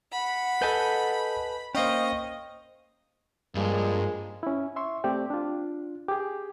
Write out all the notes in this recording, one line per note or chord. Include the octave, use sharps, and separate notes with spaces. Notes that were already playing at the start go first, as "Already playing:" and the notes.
F#5 B5
A4 B4 D#5 G#5 A5 G6
A#3 C#4 C5 D#5 F5 G5 C#6
G2 F3 G#3 A#3
C#4 E4
E5 C6 C#6
A3 C4 G4 D5
D4 F4
G4 G#4